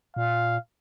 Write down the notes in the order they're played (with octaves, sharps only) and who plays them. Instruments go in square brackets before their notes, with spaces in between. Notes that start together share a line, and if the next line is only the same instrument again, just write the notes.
[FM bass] A#2 [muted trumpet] F5